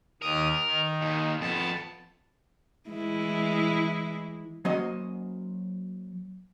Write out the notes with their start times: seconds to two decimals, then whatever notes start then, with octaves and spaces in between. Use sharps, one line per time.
0.22 D#2 A#4 D#6
0.66 D#3
1.01 D#2
1.41 F2 B3 A5
2.89 E3 G#3 E4
4.65 F#3 A#3 C#4 F#4 C5 D#5